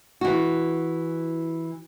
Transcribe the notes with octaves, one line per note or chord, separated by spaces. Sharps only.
E3 F#4